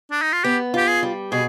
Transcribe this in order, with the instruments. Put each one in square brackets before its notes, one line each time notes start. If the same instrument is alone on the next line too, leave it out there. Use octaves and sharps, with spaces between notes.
[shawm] D4
D#4
F4
[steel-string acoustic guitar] B3 [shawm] G4
[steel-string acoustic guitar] F4 [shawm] G4
[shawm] G#4
[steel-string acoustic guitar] G3
[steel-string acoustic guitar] B2 [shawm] G#4